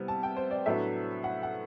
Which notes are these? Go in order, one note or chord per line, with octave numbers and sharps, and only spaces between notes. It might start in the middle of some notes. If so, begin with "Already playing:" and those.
Already playing: C3 G3 B3 E4
A5
G5
C5
D5
A2 F#3 B3 D4 E5
F#5
F#5